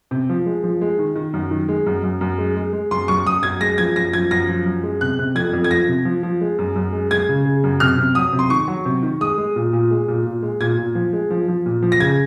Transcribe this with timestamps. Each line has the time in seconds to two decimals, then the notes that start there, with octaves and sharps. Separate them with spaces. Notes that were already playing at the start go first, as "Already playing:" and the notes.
0.11 C3
0.29 F3
0.46 G#3
0.64 F3
0.81 G#3
0.99 D#3
1.16 D#3
1.33 F#2
1.51 D#3
1.68 G#3
1.86 F#2
2.03 F#2
2.21 F#2
2.38 G#3
2.56 G#3
2.73 G#3
2.91 F#2 C6
3.08 F#2 C#6
3.25 F#2 D#6
3.43 F#2 G#6
3.60 G#3 A#6
3.78 F3 G#6
3.96 F#2 A#6
4.13 F3 G#6
4.31 F#2 A#6
4.48 F3
4.66 F#2
4.83 G#3
5.01 C3 F#6
5.19 C3
5.35 F2 G#6
5.53 F2
5.64 G#6
5.70 F3 A#6
5.88 C3
6.05 F3
6.23 F3
6.41 G#3
6.59 F#2
6.76 F#2
6.93 G#3
7.11 G#3 G#6
7.29 C#3
7.45 C#3
7.64 F#2
7.80 C3 F6
7.98 C3
8.15 F#3 D#6
8.33 C3
8.39 C6
8.50 D#3 C#6
8.68 F#3
8.85 C3
9.03 D#3
9.21 G#3 D#6
9.38 G#3
9.56 A#2
9.73 A#2
9.91 G#3
10.08 A#2
10.26 A#2
10.42 G#3
10.60 A#2 G#6
10.78 A#2
10.95 F3
11.13 G#3
11.30 F3
11.48 F3
11.66 A#2
11.82 F3
11.92 A#6
12.00 C#3 G#6